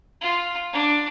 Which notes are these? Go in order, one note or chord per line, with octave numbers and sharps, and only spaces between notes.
F4
D4